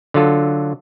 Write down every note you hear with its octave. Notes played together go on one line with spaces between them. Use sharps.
D3 F#3 F4 A4